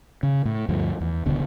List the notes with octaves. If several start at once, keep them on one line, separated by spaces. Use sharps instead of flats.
C#3
A2
D2 G2 F3
E2
D1 C#2 B2 D3